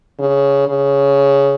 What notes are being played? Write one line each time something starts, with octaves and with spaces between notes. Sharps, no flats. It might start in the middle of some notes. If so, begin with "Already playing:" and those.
C#3
C#3